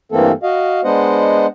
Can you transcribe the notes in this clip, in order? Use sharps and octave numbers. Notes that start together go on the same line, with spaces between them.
G2 E3 A3 A#3 C4 A4
F#4 D#5 F5
G#3 B3 D4 C5 D#5 F#5